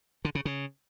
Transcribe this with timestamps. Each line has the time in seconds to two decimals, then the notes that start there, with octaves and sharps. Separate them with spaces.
0.25 D3
0.35 C#3
0.45 C#3